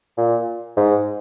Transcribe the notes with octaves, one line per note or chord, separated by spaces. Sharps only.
A#2
G#2